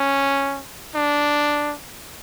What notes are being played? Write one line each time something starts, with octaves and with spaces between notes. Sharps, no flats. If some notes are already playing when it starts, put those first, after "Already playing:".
Already playing: C#4
D4